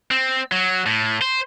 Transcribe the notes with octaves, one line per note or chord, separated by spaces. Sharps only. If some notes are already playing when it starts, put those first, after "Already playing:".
C4
F#3
A2
C5